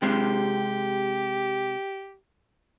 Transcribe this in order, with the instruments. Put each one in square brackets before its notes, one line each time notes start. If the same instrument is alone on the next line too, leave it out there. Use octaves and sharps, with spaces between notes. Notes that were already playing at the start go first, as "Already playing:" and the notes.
[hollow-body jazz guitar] C3 G#3 [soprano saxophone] G4